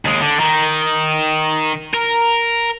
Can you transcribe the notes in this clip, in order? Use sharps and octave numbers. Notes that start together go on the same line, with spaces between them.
D#2 G#3
D3
D#3
A#4